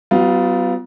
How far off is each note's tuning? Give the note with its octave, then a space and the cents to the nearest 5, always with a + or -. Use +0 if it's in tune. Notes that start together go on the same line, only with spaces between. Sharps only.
G3 -45 B3 +25 F4 +0